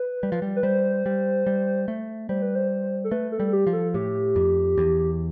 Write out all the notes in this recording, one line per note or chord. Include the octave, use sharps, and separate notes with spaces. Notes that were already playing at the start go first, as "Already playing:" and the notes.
Already playing: B4
G3
F3
G3
B4
G3 C5
G3
G3
A3
G3 C5
B4
C5
A4
A3 B4
A4
G3
A4
G4
F3
A4
A2 G4
F2
E2